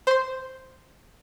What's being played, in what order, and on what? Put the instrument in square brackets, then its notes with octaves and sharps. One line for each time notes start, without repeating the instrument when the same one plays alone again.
[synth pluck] C5 C6